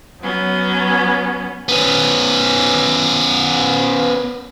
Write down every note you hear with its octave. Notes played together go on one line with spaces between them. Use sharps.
F#3 B3 C#4
B3 C#4